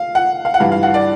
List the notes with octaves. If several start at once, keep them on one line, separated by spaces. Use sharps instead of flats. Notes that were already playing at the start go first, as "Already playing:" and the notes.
Already playing: F5
F#5
F5
F#5
G2 E3 F5
F5
F#5
D5